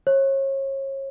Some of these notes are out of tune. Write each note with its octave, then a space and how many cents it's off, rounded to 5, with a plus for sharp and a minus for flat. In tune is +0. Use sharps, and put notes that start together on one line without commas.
C#5 -35